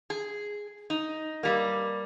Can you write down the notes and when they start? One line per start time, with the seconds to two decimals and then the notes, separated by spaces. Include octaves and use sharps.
0.10 G#4
0.90 D#4
1.43 G2 G3 A#3